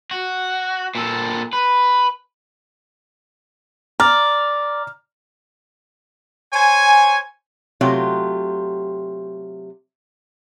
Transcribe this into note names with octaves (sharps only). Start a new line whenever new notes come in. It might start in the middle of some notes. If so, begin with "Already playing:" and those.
F#4
A#2 A4
B4
D5 A#5 F6
C5 C#5 G#5
C3 F#3 A3 F4 G4